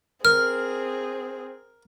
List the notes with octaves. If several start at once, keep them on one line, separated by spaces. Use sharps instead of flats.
C4 G#4 A#4 F6